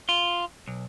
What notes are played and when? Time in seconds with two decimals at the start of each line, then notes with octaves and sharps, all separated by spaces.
0.09 F4
0.68 B1